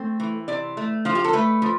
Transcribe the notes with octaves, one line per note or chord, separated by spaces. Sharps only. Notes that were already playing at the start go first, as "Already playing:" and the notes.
Already playing: A3 C4
E3
C3 D5
A3
F3 F4
G4
A4
A3 B4
F3